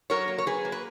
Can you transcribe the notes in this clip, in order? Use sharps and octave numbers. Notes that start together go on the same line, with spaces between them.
F#3 A#4 C#5
A#3
C#5
F#3 G#4 B4
A#3
B4